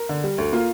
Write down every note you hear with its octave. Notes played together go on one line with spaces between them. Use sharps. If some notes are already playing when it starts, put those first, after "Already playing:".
Already playing: A#4
D3
G3
D2
A#3 F4